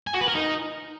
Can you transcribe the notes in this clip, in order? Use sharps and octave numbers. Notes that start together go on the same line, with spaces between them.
G#5
F#4
B4
A#4
D#4